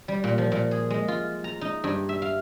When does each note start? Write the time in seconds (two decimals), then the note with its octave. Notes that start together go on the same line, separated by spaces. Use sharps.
0.08 G3
0.24 A#2
0.38 F3
0.52 A#2
0.71 G#4
0.90 G#3
1.08 F4
1.44 A#5
1.61 D#4
1.84 G2
2.09 E5
2.22 F5